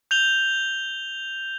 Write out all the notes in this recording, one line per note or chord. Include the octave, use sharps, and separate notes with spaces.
G6 F7 G7